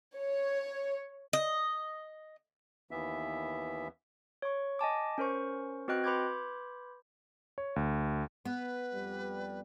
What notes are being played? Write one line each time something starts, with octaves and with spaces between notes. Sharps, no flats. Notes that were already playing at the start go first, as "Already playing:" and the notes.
C#5
D#5
D#2 E3 B3 E5
C#5 C#6
D#5 G#5 A5 D6
C#4 A#4 C5 C#6
C4 F#4 B4 D#5 G5 F#6
B4 B5 C6 D6 G6 G#6
C#5
D2
B3 B4
F2 G3